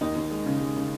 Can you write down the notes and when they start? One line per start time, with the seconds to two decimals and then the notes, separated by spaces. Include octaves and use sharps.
0.01 D#2 D#4
0.16 D#2
0.31 G#3
0.46 C#3
0.61 G#3
0.77 C#3